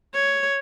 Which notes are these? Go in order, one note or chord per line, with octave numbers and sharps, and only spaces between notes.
C#5